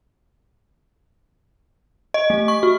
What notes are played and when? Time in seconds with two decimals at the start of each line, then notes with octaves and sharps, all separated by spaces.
2.14 D#5
2.30 A3
2.48 C#6
2.63 F#4